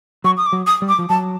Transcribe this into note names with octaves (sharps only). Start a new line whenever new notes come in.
F#3 C#6
D#6
D6
F#3
D#6
G3
D6
F3
F#3 A5